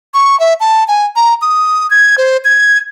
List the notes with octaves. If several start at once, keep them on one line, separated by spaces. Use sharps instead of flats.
C#6
E5
A5
G#5
A#5
D#6
G#6
C5
G#6